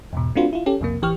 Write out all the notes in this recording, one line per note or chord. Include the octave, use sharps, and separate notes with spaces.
E2 G#2 B2
A3 C4 D4 F4 F#4 B4
E4 F4
C#4 G4 A4
B1 F2 C3 A#3
A1 E3 G4 C#6 F6